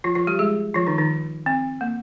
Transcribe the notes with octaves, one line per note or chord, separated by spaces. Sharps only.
F3 F4
F3 F4
G3 G4
G#3 G#4
F3 F4
D#3 D#4
D#3 D#4
C4
A#3